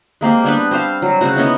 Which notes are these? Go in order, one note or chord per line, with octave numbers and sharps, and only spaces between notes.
G#3 A#3 C4 G4
G3 B3 D4 B4
C4 G4 C5 F5
F#3 G3
C#3 C4 F#4
B3 C#4 D#4 E4